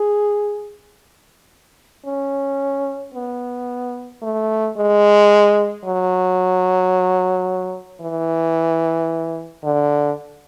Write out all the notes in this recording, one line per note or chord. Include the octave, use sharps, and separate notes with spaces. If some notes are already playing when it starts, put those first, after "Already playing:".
Already playing: G#4
C#4
B3
A3
G#3
F#3
E3
D3